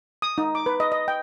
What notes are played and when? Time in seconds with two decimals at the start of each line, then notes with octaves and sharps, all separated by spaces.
0.22 D#6
0.38 D#4
0.55 D6
0.66 B4
0.80 D#5
0.92 D#5
1.08 G5